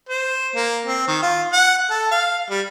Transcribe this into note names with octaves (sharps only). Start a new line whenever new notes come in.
C5
A#3
C4
D#3
F4
F#5
A4
F5
G3